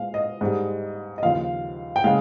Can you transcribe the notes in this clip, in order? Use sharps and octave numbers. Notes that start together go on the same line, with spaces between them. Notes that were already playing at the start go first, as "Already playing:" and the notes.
Already playing: A#2 G#3 F5
D#5
G#2 G3
D#5
D#2 C#3 F3 F5
G5
C#3 G#3 F5